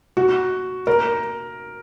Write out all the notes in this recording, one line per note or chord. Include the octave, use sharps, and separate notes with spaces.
F#4
A#4